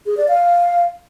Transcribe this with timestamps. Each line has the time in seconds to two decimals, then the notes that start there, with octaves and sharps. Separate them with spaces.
0.06 G#4
0.17 D5
0.28 F5